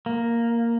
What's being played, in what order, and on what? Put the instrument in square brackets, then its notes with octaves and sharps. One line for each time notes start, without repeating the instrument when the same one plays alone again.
[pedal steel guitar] A#3